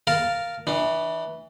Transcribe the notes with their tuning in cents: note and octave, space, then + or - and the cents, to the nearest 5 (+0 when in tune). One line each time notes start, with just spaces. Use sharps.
A#4 +0 F5 -5 A5 +0
E3 -20 D4 +30